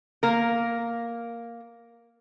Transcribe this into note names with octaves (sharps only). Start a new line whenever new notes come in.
A#3 A#4